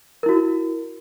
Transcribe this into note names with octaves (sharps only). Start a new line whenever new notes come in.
E4 F#4 A#4